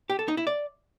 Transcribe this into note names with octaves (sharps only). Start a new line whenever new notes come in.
G4
A4
D#4
E4
D5